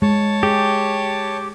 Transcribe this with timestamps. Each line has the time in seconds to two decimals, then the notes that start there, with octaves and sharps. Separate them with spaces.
0.02 G#3 C#5 A5
0.43 G4 G#4